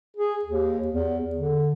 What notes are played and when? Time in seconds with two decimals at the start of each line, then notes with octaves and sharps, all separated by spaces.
0.16 G#4
0.44 D#2
0.88 E2
1.35 D3